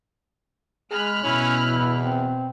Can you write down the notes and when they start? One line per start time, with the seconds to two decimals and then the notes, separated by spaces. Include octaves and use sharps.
0.91 G#3 G#4 B5 F6 F#6
1.24 B2 C#4 E4
1.71 E2
2.01 C4